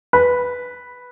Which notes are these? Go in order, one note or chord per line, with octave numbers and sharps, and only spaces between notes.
B4